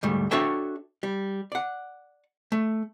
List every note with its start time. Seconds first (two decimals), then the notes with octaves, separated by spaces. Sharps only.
0.03 D2 G#2 G3 A3
0.31 D4 F#4 A4 C#5 E5 G5
1.03 G3
1.52 D5 F#5
2.52 A3